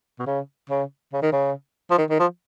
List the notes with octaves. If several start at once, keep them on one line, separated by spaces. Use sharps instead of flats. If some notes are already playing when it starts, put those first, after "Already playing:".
B2
C#3
C#3
C#3
D#3
C#3
F3
D#3
D#3
F3